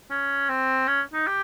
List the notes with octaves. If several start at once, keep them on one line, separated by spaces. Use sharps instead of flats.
C#4
C4
C#4
D#4
G4